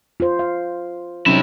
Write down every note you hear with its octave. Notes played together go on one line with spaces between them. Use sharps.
F4 C5
F5
C3 F#3 C#4 D#4 E4